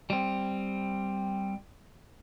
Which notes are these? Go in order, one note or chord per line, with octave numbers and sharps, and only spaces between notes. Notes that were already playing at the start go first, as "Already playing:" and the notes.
G3 C4